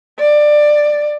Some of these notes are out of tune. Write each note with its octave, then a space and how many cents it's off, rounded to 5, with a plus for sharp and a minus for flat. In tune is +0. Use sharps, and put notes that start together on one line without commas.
D5 +15